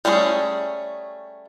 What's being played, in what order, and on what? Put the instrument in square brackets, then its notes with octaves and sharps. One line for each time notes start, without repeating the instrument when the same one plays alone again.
[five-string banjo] G3 A3 C#4 F4 G#4